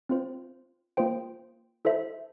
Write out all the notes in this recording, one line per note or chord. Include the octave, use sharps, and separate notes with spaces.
C4 F4 C5
A#3 F4 C5 G5
E4 A4 C5 E5